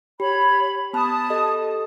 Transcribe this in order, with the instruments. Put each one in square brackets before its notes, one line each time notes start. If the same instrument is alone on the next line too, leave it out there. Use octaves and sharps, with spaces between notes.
[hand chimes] G4 [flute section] C#5 B5
[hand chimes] B3 B5 F#6 [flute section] A5 D#6
[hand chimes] G4 A4 D#5